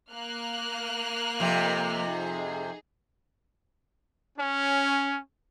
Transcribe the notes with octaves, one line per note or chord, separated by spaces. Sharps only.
A#3 F6 F#6
F2 C3
D#4 G#4
C#4